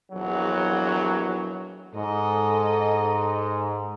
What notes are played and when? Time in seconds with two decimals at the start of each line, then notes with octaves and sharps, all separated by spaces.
0.11 A#1 E2 F#3
1.95 G#2 A4 D#5